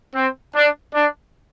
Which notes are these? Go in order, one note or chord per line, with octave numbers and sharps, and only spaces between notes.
C4
D4
D4